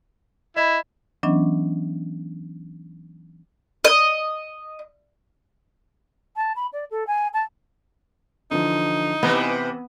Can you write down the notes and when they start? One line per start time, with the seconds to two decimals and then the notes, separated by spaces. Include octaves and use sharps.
0.57 E4 D#5 B5
1.23 E3 F#3 B3 C#4 D4 D#5
3.85 D#5
6.36 A5
6.56 B5
6.72 D5
6.90 A4
7.07 G#5
7.33 A5
8.51 D3 E3 F3 D#4
9.23 C3 E3 B3 C4